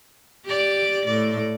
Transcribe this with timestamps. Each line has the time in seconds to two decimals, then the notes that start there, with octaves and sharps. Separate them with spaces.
0.45 G4 D5
1.06 A2 D5